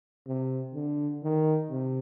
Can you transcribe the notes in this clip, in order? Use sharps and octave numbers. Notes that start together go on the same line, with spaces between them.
C3
D3
D#3
C3